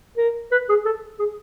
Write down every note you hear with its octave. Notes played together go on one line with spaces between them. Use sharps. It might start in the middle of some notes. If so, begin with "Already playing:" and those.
A#4
B4
G#4
A4
G#4